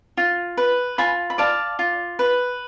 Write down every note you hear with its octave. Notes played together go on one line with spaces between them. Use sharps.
F4
B4
F4 G#5 B5
B5
D5 F5 A5
F4
B4